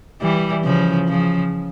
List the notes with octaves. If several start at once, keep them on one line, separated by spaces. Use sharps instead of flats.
E3 G3
C#3 F3
C#3 F3